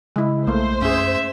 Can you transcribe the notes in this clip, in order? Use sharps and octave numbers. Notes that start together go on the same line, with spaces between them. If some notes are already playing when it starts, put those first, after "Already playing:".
C#3 G#3 E4
B1 A3 A#3 C5
F#2 C#4 G#4 E5